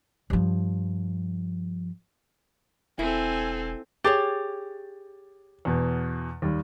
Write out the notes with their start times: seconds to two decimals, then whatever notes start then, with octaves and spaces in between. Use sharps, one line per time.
0.30 G2 F3
2.99 E1 C4 E4 A4 G#5
4.04 G4 G#4 C#5 A6
5.65 E2 B2
6.42 D#2 G3